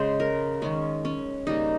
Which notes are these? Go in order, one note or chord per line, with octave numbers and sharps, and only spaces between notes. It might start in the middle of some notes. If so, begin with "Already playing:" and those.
Already playing: C#3 G#3 C5
A#4
D#3 G#3 C#4
C#4
C#3 G3 A#3 D#4